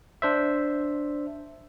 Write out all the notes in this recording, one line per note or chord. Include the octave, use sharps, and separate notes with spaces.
D4 C5 E5